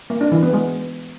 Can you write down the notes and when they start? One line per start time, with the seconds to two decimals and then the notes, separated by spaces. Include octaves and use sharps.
0.10 A#3
0.21 D4
0.32 E3
0.43 B3
0.53 G#3